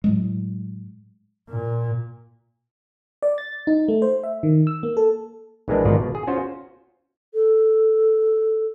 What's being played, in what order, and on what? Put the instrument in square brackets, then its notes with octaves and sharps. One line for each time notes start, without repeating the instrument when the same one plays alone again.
[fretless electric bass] A2 F#3 G#3
[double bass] A#2
[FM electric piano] D5
A6
D#4
A3
C5
E5
D#3
E6
A#3
A4
[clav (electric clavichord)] A#1 E3 G#3 A#3 D4 B4
G#1 G#2 B2 D#3 F4 D5
B2
G#4
C#4 F4 F#4 C5
[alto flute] A4